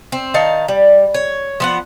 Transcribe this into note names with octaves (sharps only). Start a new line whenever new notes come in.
C4
D#3 D#4 F5 A5
G3
C#5
F3 B3 F#5